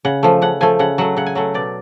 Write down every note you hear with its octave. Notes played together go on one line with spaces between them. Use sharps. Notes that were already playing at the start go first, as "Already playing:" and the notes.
C#3 F#5
F3 A3
C#3 F#5
F3 A3 G#5
C#3 F#5
F#3 A3 F#5
C#3 F#5
G#5
F#3 A3 F#5
B2 D5